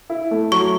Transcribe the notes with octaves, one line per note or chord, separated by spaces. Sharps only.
E4
A3
F#3 C#6